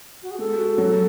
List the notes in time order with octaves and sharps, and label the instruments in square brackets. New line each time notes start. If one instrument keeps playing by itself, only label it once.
[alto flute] F#4
G#4
[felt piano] G#3 [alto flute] A4
[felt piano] F#4
F#3